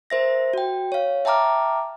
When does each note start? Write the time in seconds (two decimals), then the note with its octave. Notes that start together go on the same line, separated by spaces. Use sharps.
0.10 A#4 C5 E5 A#6
0.54 F#4 G5
0.92 C#5 F5
1.25 E5 G5 A5 A#5 D6 F6